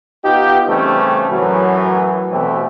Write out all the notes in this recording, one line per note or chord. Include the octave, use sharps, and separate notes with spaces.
B3 D#4 F4 G4
C#3 E3 G3 A3 C4 C#4
F#2 A2 E3 F#3
B2 E3 G3 A3 C4 G4